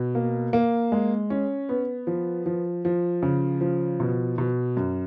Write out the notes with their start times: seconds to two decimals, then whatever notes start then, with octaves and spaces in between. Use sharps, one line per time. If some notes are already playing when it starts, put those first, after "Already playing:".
Already playing: B2
0.15 A#3
0.53 A#3
0.92 G#3
1.30 C#4
1.69 B3
2.07 F3
2.46 F3
2.85 F3
3.22 C#3
3.61 F3
4.00 B2
4.38 B2
4.77 F#2